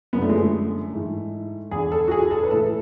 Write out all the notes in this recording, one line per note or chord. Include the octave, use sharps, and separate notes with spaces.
F#2 D3 B3
A3
G#3
A3
G#2 E3
E2 D3 G#4
A4
F#4
G#4
A4
B4
A2 E3 A4